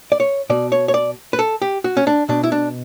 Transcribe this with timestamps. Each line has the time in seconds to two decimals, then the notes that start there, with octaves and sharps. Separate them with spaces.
0.12 D5
0.20 C#5
0.50 B2 D5
0.72 C#5
0.88 C#5
0.94 D5
1.33 B4
1.39 A4
1.62 G4
1.84 F#4
1.97 C#4
2.07 D4
2.29 B2 D4
2.43 E4
2.52 D4